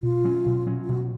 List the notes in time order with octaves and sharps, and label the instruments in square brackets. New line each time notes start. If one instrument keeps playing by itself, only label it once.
[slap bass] B2 [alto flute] F4
[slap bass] F#3 C#4
B2
F#3 C#4
[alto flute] F4
[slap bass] B2 [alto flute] F#4